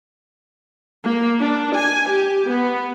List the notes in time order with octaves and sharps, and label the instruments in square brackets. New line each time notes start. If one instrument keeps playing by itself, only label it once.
[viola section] A#3
D4
G#5
G4
B3